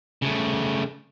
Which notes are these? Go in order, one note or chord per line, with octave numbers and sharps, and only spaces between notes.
C#3 A3